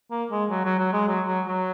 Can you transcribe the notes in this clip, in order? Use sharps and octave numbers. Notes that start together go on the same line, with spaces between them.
A#3
G#3
F#3
F#3
F#3
G#3
F#3
F#3
F#3